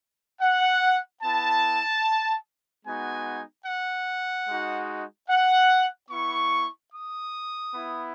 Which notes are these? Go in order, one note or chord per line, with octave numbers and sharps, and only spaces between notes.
F#5
B3 E4 A5
G#3 B3 D#4 F#4 G#5
F#5
G#3 D#4 F#4
F#5
B3 E4 C#6
D#6
B3 E4